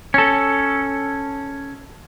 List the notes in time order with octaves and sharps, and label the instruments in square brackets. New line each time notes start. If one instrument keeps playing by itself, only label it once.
[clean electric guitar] C#4 A4